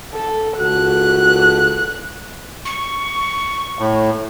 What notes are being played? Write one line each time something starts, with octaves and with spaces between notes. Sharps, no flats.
A4
C#2 F#4 A4 F#6
C#6
A2